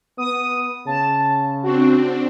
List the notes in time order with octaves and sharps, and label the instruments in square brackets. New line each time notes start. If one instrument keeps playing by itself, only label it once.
[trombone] B3 [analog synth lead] D#6
[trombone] C#3 [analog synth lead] A5
[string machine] C4 D4 [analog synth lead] F#4